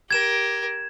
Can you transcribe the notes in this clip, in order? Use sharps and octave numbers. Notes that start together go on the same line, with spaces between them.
G4 A#4 G#6 E7